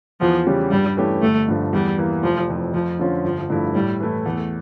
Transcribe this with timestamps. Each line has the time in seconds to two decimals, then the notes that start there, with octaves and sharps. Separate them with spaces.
0.21 E2 F3
0.46 C#3 G3 C#4 G4
0.71 G2 G3
0.97 E3 A3 C#4 G4
1.22 G1 A3
1.48 G2 D3 F3 A3
1.73 E2 G3
1.98 E3 A#3 E4
2.23 F1 F3
2.49 F2 E3
2.73 F2 F3
2.99 D3 F3 C#4 F4
3.24 G1 F3
3.50 G2 F3 A3 E4
3.75 A2 G3
4.00 E3 A3 E4
4.25 E2 A3